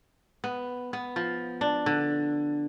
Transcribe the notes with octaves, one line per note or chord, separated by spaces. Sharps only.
B3
B3
F3
D4
D3